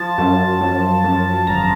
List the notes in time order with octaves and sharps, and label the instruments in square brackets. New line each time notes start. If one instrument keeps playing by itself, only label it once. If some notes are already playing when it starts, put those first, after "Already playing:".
Already playing: [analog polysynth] F3 A5
F#2
F#2
F#2
G#1 A#5